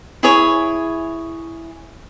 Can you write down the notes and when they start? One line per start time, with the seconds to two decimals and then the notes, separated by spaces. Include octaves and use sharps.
0.23 E4 G#4 C#5